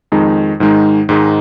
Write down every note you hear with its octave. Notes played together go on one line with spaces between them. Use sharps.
F2 D#3 G#3 D#4
G#2 D#3 G#3 D#4
G#2 D#3 G#3 D#4